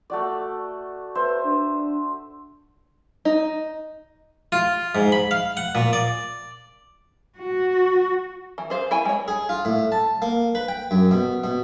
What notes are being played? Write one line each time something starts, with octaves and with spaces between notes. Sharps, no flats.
A3 F#4 D5
B4 C5 E5
D4
D#4
F4
G#2
B5
F5
F#5
A#2
D5
F#4
E3
G#4 C5 F5
E4 G5 G#5
G#3 C#5
G#4
F4
A2
A5
A#3
B4
G5
F#2
B2
B2